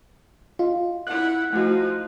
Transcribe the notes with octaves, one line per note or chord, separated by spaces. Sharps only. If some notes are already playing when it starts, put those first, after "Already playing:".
F4 D#5
E4 F#5 F#6
F3 A3 D#4 E4 F#4